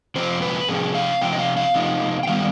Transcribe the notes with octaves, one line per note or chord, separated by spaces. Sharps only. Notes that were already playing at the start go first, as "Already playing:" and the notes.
C3 F3 C4 C5
B4
C3 F3 C4 G#4
F5
C3 F3 C4 G5
D#5
F5
F5
C3 F3 C4 D#4
G5
D#3 G3 B3 F5